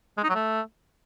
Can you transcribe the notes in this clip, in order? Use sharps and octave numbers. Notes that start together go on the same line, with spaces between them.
G#3
D#4
F#3
A3